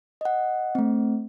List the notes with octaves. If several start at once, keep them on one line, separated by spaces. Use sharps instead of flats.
D#5 F#5
A3 C4